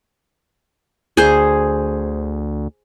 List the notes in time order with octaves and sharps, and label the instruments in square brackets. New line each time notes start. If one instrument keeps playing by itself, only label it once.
[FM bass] D2 [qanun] G#4 C5